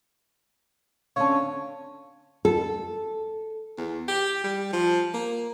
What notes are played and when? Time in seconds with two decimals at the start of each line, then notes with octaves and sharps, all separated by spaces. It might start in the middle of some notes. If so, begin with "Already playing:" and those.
1.16 D3 C4 C#4 C#5 F5 A5
2.45 A4
3.78 E2
4.08 G4
4.44 G3
4.73 F3
5.14 A#3